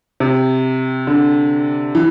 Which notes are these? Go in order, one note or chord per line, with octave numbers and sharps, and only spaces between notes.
C3
D3
E3